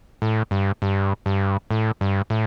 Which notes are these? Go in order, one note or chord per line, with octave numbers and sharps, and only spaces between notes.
A2
G2
G2
G2
A2
G2
A2